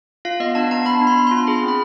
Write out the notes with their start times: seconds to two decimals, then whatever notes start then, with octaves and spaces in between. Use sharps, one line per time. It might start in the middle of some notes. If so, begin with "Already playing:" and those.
0.25 F4 F5
0.40 B3 D#5
0.55 D4 A5
0.71 B3 A#5
0.86 B3 B5
1.01 D4
1.07 C6
1.17 B3
1.27 F4 C6
1.47 G#4 B5
1.63 C4
1.68 B5